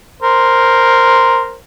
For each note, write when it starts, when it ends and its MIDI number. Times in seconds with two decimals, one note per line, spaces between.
0.22 1.55 70
0.22 1.55 72